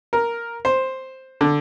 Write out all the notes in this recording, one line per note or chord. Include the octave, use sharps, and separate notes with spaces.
A#4
C5
D3